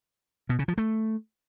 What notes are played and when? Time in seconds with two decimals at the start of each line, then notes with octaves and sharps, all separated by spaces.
0.49 B2
0.59 C#3
0.68 F3
0.78 A3